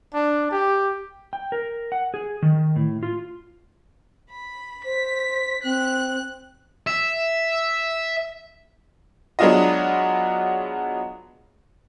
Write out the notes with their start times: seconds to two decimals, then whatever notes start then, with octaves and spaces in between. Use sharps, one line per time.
0.14 D4
0.51 G4
1.33 G5
1.52 A#4
1.92 F#5
2.14 G#4
2.42 D#3
2.76 A2
3.03 F4
4.30 B5
4.84 C5 B6
5.64 C4 F#6
6.87 E5
9.39 F#3 G#3 B3 D4 F4 D#5